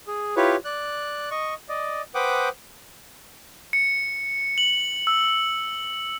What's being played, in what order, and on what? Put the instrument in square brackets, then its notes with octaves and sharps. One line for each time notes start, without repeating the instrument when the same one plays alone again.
[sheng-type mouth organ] G#4
E4 F4 G4 B4 C#5
D5 F#6
D#5 C#6
D5 D#5
B4 C5 F#5 G5 D6 D#6
[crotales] C#7
F#7
E6